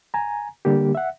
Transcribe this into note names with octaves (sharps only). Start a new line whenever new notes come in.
G#5 A#5
D3 G3 A#3 G4
E5 F#5